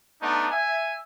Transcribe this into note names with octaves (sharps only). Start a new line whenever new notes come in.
A3 B3 D4 D#4
E5 G#5